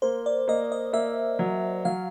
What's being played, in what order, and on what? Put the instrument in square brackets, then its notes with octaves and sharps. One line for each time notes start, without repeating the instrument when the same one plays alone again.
[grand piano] A#3 [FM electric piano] C5
[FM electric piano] D5
[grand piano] A#3 [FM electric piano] D#5
[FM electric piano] D#5
[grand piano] A#3 [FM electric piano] E5
[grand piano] F#3
[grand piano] F#3 [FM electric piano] F5